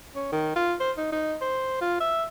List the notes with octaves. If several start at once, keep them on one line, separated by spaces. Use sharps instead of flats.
C#4
D#3
F4
C5
D#4
D#4
C5
F4
E5